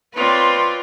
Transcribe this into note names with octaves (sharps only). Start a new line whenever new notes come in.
C4 F4 B4 C#5 D5